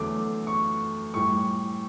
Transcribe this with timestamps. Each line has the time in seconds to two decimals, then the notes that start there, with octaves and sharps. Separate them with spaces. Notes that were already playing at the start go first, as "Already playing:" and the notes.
Already playing: E2 D3 F#3 A3 D6
0.47 C#6
1.14 A2 G3 C#6